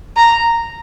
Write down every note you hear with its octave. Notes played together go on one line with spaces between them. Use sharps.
A#5